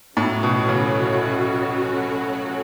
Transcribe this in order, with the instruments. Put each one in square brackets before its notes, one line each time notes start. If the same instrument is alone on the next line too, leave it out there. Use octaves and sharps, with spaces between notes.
[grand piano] A2 [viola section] F#3 C#4 F#4 A4
[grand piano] B2
C#3